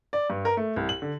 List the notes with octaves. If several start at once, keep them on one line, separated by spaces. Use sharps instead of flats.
D5
G2
A#4
A3
C2
F#7
D3